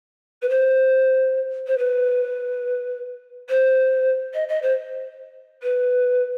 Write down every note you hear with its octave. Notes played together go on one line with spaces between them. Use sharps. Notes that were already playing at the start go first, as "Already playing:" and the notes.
B4
C5
C5
B4
C5
D#5
D#5
C5
B4